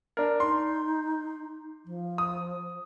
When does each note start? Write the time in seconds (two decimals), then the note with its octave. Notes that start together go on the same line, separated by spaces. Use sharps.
0.17 D4 A#4
0.40 D#4 C6
1.86 F3
2.18 D#6